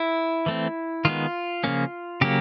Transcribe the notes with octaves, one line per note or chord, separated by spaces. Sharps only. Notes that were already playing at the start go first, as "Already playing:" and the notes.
Already playing: E4
E3 A3 C4
D#3 G#3 B3 F4
C#3 F3 A#3 C#4
C#3 F#3 A#3 G4